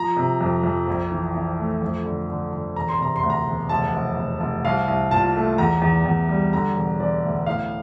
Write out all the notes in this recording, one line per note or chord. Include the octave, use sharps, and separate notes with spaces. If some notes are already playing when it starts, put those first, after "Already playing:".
Already playing: F3 A#5
C3
F2
F2
A#1
E3
E3
A3
F2
D3
D3
D3
E1 A#5
C6
C3 A#5
C6
D2
A#5
E1
F1 A5
F1
F1
F1
C2 F5
C2
A#2 A5
A3
E2 A#5
E2
E2
G3
D3 A#5
E1
E1 D5
D2
A2 F5